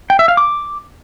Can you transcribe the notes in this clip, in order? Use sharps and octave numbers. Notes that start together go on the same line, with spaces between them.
G5
E5
F5
D6